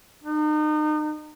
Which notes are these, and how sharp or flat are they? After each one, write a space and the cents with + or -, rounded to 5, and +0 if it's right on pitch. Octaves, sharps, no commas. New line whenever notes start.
D#4 -35